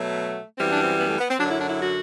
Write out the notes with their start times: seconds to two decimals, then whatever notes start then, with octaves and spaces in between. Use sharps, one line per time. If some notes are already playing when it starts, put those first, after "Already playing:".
Already playing: B2 F#3 A3
0.57 F#2 E3 G3 C4
0.70 D4
0.83 C4
0.98 B3
1.09 A3
1.18 B3
1.29 C4
1.39 F#2 D3 F#3 D4
1.49 E4
1.60 D4
1.70 E4
1.80 F#4